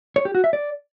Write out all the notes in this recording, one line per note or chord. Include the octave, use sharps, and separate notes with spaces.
C#5
G4
F#4
E5
D5